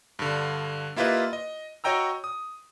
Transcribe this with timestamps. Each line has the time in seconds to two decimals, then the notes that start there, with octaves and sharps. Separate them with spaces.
0.19 G2 D3
0.96 A#3 E4 F4 G4 B4 D#5
1.33 D#5
1.84 F#4 C#5 D#5 G5 A#5 E6
2.24 D#6